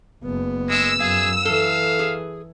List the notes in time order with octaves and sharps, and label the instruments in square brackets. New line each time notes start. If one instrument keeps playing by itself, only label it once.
[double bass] F#1 B3
[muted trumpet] G#3 [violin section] E6
[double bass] F#2 [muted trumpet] G#4 [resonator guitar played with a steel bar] F5
[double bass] E3 [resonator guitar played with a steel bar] A4 [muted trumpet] F5
[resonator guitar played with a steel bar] G#4